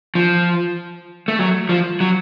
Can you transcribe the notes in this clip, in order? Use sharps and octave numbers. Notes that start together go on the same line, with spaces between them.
F3
A3
F#3
F3
F#3